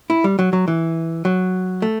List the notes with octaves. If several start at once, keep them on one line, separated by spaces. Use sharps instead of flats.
E4
G3
F#3
F#3
E3
F#3
A3